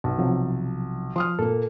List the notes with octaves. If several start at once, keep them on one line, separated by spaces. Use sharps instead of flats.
B1
C3 F3 F#3
F3 C6 D#6 F6
A#2 A#3 A4